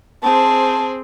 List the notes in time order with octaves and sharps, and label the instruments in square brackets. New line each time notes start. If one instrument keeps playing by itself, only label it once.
[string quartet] C4 G#4 C5 [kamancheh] A5